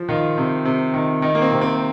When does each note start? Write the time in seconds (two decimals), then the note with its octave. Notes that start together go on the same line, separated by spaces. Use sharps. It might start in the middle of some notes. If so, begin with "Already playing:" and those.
Already playing: F3
0.09 D#3 F4
0.38 C3
0.65 C3
0.94 D#3
1.22 D#3 D#4
1.35 A#3
1.42 C4
1.51 C3
1.61 C4